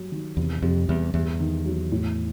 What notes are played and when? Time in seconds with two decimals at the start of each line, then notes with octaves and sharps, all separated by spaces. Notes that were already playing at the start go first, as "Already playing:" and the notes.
Already playing: G2 F#3
0.12 D#3
0.37 E2 C3
0.62 F2 C3
0.88 E2 G3
1.14 E2 G2
1.40 D#3
1.65 F#3
1.92 A2